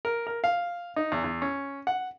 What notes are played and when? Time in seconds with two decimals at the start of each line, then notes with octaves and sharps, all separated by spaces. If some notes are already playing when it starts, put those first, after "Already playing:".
0.05 A#4
0.27 A#4
0.44 F5
0.96 D#4
1.12 E2
1.24 E2
1.42 C#4
1.87 F#5